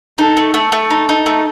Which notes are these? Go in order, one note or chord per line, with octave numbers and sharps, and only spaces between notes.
D#4 A4
A3
A3 A4
A3
D#4
D#4
A3